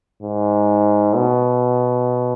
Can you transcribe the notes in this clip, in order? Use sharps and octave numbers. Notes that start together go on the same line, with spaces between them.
G#2
B2